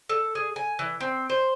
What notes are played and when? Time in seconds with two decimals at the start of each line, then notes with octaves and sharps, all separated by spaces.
0.09 A4
0.35 G#4
0.56 G#5
0.79 E3
1.00 C4
1.30 C5